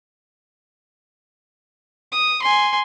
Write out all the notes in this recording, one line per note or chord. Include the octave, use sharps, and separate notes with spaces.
D#6
G#5 C6